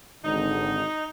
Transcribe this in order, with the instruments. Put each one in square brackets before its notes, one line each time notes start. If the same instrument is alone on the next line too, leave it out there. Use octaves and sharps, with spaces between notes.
[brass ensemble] G#1 D3 [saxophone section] D#4